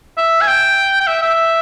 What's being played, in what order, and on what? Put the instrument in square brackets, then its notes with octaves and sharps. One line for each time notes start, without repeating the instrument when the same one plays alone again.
[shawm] E5
G#5
G5
G5
E5
E5